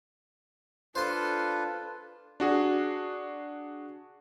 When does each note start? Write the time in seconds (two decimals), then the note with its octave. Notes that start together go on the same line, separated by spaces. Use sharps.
0.95 D4 F4 A4 B4 C5 C6
2.40 D4 F#4 G#4